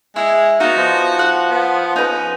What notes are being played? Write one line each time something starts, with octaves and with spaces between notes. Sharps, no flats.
G#3 E4
B3 D#4 F#4 F5
F3
F#5
B3
C#4 D#4 B4